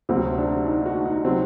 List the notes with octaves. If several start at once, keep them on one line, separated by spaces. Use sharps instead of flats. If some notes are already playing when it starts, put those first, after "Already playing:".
D2 C3 F#3 C4
D4
D#4
F#4
D#4
C3 F#3 C4